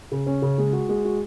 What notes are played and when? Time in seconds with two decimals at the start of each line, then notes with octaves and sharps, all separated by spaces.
0.12 C#3
0.26 C#4
0.42 C#3
0.58 G#3
0.73 F#4
0.89 G#3
1.05 F#4